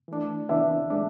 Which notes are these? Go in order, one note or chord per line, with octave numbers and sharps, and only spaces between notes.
E3 A3 D4
C#3 E3 B3 D4 E5
A2 G#3 D4